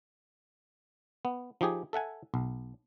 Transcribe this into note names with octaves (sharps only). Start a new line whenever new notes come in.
B3
F3 D#4 G4 G#4
A4 E5 F#5 G#5
B1